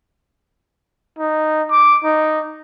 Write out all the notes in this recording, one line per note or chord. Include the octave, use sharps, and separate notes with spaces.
D#4
D6
D#4